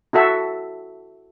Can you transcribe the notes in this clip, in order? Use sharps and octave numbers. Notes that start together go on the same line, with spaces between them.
E4 F#4 A4 E5